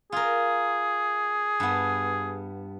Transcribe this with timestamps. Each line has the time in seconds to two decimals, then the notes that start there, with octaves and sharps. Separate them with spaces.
0.12 F4 G#4 A#4
1.60 G2 B3